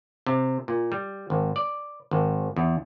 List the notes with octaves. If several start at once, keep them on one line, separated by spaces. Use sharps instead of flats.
C3
A#2
G3
G#1
D5
G#1
E2